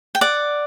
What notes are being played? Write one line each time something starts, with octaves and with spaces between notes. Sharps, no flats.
G5
D5 F#5